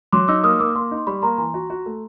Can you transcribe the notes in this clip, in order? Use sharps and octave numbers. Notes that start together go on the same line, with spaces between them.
F#3 C6 D6
D#4 D6 E6
A#3 D#6 F6
A#3 D6 E6
A#3 C6 D6
D#4
C6
G3 B5 C#6
A#3 A#5 C6
E3 A#5 C6
F#4
F#4
A3